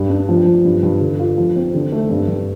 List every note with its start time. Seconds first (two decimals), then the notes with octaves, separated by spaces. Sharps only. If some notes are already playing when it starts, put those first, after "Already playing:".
Already playing: G2
0.10 D4
0.29 F3
0.46 F3
0.65 G2
0.83 G2
1.01 D3
1.19 F4
1.38 F3
1.56 C4
1.74 D3
1.92 A3
2.10 G2
2.28 G2